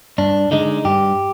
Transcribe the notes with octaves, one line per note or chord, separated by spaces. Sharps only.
G2 D4
D3 G#3 D#4
G2 G4